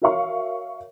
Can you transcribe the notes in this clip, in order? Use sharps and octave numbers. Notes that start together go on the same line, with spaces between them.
F#4 A#4 C#5 E5 F5 C#6